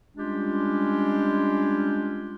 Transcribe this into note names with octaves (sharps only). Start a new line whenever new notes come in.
G3 G#3 C#4 D4 F4 G4